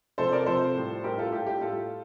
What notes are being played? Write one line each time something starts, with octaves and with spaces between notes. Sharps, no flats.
C3 F3 A4 C5
A#4 D5
C3 F3 A4 C5
A2 G3
A2 G3 G4 A#4
F4 A4
A2 G3 G4
G4
A2 G3 F4 A4